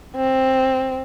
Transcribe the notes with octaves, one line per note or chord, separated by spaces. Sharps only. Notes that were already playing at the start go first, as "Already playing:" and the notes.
C4